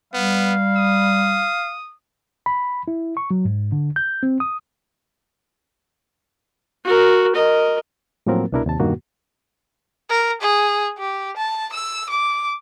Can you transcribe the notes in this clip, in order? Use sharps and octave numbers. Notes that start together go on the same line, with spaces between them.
G3 B3 F5
D#6
B5
E4
C#6
F#3
G#2
D3
G6
C4
D#6
F#4 A#4
A#4 D#5
A2 F3 F#3 A#3 C4 A#4
C2 B2 D4 E4 A#4
D#2 C3 A5
E2 G2 B2 D#3 A#3 F#4
A#4
G#4
G4
A5
E6
D6